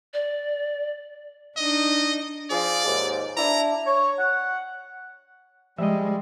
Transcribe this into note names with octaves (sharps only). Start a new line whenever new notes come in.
D5
D4 D#4 D#5
F3 G#4 D5
D#2 G#2
D4 E4 A#5
C#5
F#5
F3 G3 G#3 D#5 E5